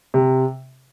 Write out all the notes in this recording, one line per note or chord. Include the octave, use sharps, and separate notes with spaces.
C3